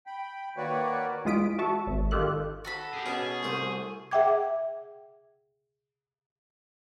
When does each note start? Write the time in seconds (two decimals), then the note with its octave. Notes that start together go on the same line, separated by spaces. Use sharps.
0.06 G5 B5
0.57 D#3 A#3 F#4 B4 C#5 D5
1.25 E3 G#3 F4 D#6 B6 D7
1.59 F#4 E5 A5 C#6
1.87 G#1
2.11 D#3 F4 G4 A4 F#6
2.65 F#4 A4 B5
2.93 G4 G#4
3.06 B2 C#4 G#4
3.43 C2 A3 C5
4.11 G#4 E5 F#5 G5 D6 G#6